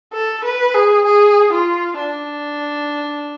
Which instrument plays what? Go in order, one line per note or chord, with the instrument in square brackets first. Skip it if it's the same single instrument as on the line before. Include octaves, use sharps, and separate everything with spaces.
[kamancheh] A4
B4
G#4
G#4
F4
D4